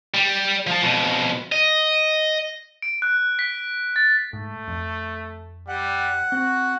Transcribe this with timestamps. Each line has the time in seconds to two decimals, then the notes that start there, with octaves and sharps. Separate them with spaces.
0.14 G3
0.67 F3 A5
0.83 F2 B2
1.52 D#5
2.82 D7
3.02 F#6
3.39 B6
3.96 A6
4.33 G#2 A3
4.68 F2
5.68 G3 F#5
6.32 C4 F#4